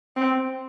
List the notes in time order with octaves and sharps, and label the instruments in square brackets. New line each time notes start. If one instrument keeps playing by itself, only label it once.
[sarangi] C4